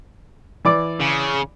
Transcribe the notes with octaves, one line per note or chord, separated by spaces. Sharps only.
E3 D5 D6
C#3